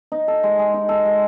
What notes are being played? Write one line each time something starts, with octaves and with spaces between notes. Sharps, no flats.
D#4
A4
G#3
G#3
D#4
A4
G#3